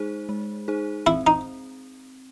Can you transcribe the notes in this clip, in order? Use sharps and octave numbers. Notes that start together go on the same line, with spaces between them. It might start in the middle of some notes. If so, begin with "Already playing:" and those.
Already playing: G#3 D#4 G#4 C5
G#3
D#4 G#4 C5
C4 E4
D#4